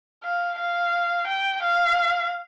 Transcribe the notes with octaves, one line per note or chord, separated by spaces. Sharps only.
F5
F5
G5
F5